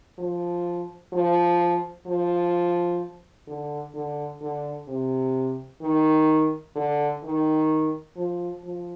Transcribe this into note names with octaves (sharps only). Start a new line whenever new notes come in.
F3
F3
F3
D3
D3
D3
C3
D#3
D3
D#3
F3
F3